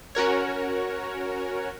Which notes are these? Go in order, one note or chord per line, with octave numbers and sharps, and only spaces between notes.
C#4 F#4 A#4 C#5